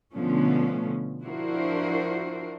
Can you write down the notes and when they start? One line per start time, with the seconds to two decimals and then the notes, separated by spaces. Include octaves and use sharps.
0.13 B2 D3 F3 A3 B3 C#4
1.23 F3 D4 E4 F#4 A#4 C5